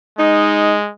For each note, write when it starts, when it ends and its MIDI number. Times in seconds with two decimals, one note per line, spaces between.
0.19 0.91 56
0.19 0.75 63